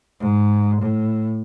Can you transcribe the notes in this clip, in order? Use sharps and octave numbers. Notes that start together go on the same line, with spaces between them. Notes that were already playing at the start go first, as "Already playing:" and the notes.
G#2
A2